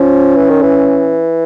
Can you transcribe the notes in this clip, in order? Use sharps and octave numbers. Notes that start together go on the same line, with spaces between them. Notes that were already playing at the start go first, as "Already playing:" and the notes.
Already playing: F3 C#4
E3
D#3
E3